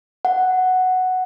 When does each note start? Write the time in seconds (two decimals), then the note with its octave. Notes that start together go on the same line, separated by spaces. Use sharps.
0.25 F#5